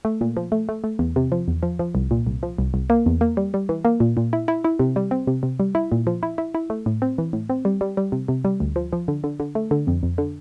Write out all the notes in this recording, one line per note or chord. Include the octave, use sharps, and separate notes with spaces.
A3
A#2
F3
A3
A3
A3
E2
C3
F3
E2
F3
F3
C2
A#2
C2
F3
C2
C2
A#3
E2
A#3
G3
G3
E3
A#3
A#2
A#2
E4
E4
E4
C3
G3
C4
C3
C3
G3
E4
A#2
F3
E4
E4
E4
A3
A2
C4
E3
A2
C4
G3
G3
G3
C3
C3
G3
D2
F3
F3
D3
D3
D3
A3
D3
F2
F2
D3